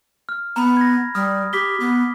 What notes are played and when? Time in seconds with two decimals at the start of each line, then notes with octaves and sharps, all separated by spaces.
0.29 F6
0.56 B3 A#5 B5
0.77 G#6 A#6
1.15 G3 D#6 F6
1.53 G4 D6 B6 G7
1.80 B3